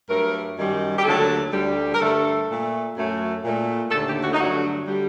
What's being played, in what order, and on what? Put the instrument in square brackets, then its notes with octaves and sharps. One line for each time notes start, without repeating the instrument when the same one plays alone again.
[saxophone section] G2 F#3 A3 A#4
F#2 D#3 G3
G4
D#2 D3 F#3 A3 A4
D2 D3 G3
A#4
G2 D3 A3 A4
A#2 A3
F#2 F#3 A3
A#2 A3
D#2 D3 A3 A4
G4
F#4
D#4
G2 D3 F#3 A3 F#4
D3 G3